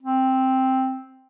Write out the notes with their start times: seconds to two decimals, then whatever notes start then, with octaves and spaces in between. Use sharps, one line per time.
0.03 C4